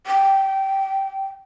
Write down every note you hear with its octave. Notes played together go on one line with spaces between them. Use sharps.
G5